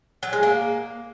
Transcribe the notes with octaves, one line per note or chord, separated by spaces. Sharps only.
F#3
G#3
A#3